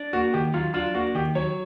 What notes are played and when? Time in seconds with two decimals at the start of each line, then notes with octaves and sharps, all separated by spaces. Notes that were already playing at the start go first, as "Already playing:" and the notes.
Already playing: D4
0.13 A#3 F#4
0.33 D#3 G4
0.54 F#3 F4
0.74 D4 F4
0.95 A#3 F#4
1.15 D#3 G4
1.35 F#3 C#5